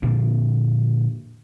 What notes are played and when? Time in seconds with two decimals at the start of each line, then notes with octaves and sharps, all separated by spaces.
0.02 A#2 D3 F3 A#3